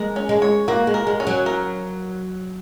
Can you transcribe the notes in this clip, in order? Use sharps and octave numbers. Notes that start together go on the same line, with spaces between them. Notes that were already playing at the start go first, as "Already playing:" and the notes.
Already playing: G#3 A#4
C#4
G#3
C#5
A#3 F#4
G#3
A#4
G#3
C#4
F#3
A#4